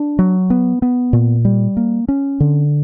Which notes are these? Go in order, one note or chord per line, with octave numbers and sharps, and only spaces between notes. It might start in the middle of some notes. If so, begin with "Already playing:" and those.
Already playing: D4
F#3
B3
B3
A#2
G3
A#3
C#4
D3